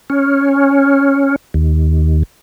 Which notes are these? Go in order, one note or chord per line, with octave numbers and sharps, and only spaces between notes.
C#4
D#2